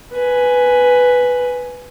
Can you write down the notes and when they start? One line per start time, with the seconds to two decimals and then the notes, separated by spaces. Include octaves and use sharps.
0.13 B4 G#5